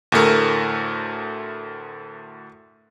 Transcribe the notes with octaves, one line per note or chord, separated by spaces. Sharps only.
D2 A2 A3 A#4